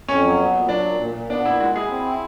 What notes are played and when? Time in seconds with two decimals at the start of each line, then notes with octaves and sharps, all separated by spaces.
0.08 F2 C#4
0.24 F#3
0.39 B3
0.54 A#2
0.69 F#3 D4
0.84 A#2
1.00 A#2
1.15 A#2
1.30 B3 D4
1.45 A#2 E4
1.60 G#3 F#4
1.76 E4 G#4
1.90 C4
2.06 E4